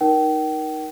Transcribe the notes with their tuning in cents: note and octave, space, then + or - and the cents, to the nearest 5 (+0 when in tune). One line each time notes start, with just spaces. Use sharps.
D#4 +0 A#4 +20 G5 -35